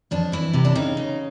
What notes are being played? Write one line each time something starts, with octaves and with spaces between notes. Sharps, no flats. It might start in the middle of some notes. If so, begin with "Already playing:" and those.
F2 D4
E3 E4
C3
D4
C#3 D#4
C#3